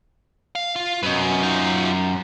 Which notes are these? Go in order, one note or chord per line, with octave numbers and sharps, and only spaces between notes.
F5
F4
F#2 B4 D#5
D#4 F4